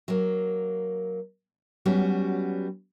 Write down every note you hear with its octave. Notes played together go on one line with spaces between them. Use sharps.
F#3 A#3
F#3 G3 B3 C#4 F#4